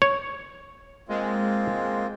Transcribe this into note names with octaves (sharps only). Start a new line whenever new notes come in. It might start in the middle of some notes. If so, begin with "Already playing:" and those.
C#5
G#3 A#3 C4 F4